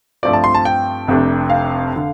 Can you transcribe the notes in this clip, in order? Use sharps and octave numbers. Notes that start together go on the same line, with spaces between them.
G2 F3 A3 C4 F4 D5
A5
C6
A5
G5
F1 F2 C3 A3 D4
F5
D3